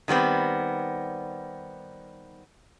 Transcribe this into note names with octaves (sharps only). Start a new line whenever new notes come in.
D#3 G3 B3 C4